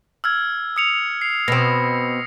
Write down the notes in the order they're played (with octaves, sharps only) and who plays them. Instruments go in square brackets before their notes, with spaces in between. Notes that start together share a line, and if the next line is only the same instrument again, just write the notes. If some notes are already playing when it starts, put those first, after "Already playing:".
[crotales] E6 F6 G#6
D#6 C#7 F7
C7
[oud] B2 C4 [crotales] A#6